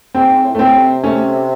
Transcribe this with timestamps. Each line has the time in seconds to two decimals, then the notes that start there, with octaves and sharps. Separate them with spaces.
0.15 G#2 C4
0.44 A2
0.55 A3
0.59 C4
0.74 C3
1.04 A3 C#4